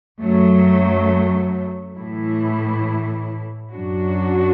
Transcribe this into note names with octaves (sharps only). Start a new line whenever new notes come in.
F#2 F#3 A3
A2 E3 A3 E4
F#2 F#3 D4 F#4